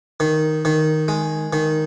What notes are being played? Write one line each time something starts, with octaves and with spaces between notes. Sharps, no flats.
D#3
D#3
G#3
D#3